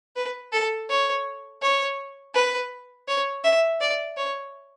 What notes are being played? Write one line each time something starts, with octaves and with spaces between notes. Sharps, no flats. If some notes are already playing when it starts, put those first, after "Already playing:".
B4
A4
C#5
C#5
B4
C#5
E5
D5
C#5